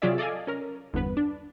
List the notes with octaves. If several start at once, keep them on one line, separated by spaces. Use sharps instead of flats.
C3 F#3 F4 G#4 D5 E5
A4 D5 D#5 F5 G#5
C#4 A#4
G1 E2 B3 B4
D4